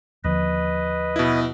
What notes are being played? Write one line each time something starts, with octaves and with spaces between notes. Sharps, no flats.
D#2 D3 F3 B4 D#5
B2 E4